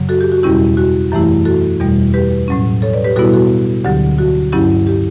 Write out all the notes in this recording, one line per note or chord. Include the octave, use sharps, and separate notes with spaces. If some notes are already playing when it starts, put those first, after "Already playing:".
Already playing: F#2 C#3 F#3
F#4 A4
G4
F#4
E2 B2 G3 C#4 E4 G4
F#4
F#2 E3 A3 E4 G4
F#4 A4
E2 B2 G3
G4 B4
A2 F#3 C#4
A4 C#5
B4 D5
G4 B4
B2 G3 B3 E4 F#4 A4
F#4 A4
D2 D3 F#3 G4
F#4
G2 F#3 C#4 E4 G4
G4